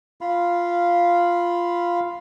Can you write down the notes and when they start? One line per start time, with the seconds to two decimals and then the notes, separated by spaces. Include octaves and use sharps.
0.21 F4 F5 B5